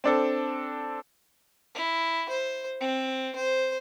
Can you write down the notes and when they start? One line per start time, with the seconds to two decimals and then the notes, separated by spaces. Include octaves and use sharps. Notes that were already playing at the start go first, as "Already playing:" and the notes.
0.04 C4 D4 A4
1.74 E4
2.29 C5
2.80 C4
3.35 C5